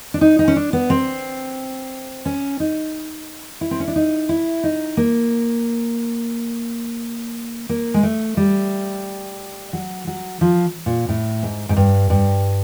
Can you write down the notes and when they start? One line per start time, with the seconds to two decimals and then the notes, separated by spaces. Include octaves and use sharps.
0.14 D4
0.21 D#4
0.39 D#4
0.48 C#4
0.56 D4
0.73 B3
0.90 C4
2.26 C#4
2.60 D#4
3.61 E4
3.71 C4
3.80 C#4
3.88 D4
3.96 D#4
4.29 E4
4.63 D#4
4.97 A#3
7.69 A#3
7.94 G#3
8.03 A3
8.37 G3
9.73 F#3
10.07 F#3
10.41 F3
10.86 A#2
11.09 A2
11.43 G#2
11.69 G#2
11.77 G2
12.10 G2